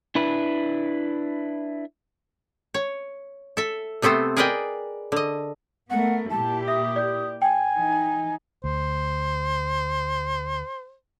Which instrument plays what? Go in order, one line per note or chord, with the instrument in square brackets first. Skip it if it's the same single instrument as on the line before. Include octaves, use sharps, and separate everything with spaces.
[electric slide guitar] D4 E4 B4
[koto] C#5
A4 E5
C3 A3 B3 C4 C5
G#4 A#4 B4 D5 D#5 G5
D3 D#5
[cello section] A3 B3 A#4 [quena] F#5
[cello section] A#2 E4 G4 [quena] A5
[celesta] E5 [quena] D#6
[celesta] D5 G6
[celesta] G5 [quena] G#5
[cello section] E3 D#4
[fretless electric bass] D2 [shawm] C5